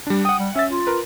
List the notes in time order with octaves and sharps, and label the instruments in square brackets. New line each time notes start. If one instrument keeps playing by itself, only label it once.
[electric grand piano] G3 D4
[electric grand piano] F#5 G5 [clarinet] D#6
[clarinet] G3
[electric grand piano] C#4 A6 [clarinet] E5
[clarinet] F4
[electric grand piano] A#4 B4